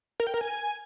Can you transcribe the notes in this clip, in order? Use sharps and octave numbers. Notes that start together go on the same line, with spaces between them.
A#4
G5
A#4
G#5